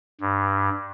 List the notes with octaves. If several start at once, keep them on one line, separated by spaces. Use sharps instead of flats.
G2